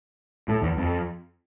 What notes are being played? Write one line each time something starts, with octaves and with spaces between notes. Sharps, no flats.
A2
E2
F2